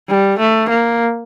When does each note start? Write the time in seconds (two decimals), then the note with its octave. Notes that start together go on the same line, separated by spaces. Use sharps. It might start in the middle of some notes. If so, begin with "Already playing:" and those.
0.08 G3
0.39 A3
0.69 A#3